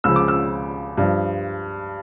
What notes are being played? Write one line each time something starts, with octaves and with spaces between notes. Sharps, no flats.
C#2 C#3 F3 E6
D6
E6
G2 F3